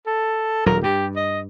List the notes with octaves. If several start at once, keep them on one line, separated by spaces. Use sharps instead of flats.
A4
D#1 D#2 F#3 A#4
G2 G4
D#5